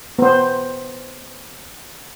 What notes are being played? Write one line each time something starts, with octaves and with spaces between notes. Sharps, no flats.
B3 C5